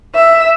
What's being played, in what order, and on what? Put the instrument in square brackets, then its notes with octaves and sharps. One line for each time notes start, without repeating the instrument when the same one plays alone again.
[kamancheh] E5